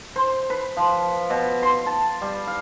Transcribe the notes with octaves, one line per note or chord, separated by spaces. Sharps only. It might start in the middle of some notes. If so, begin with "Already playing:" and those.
C5
B4
F3
B2
C6
A5
G3
F5